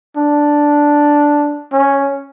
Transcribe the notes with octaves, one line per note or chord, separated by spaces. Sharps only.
D4
C#4